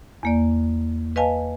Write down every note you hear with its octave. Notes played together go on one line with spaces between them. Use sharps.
E2 A#3 D5
B4 D#5 F5 G#5 A5